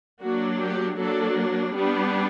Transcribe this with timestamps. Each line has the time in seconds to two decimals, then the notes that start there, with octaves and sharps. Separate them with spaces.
0.22 F#3 A#3 D4 F#4
0.60 G4
0.98 F#3 A#3 D4 A4
1.75 G3 B3 D4